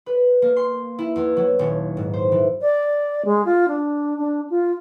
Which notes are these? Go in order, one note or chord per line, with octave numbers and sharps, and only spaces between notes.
B4
A#3
C6
E4
E2
F#3
D#1
G#2
C5
E3
D5
G#3
F4
D4
D4
F4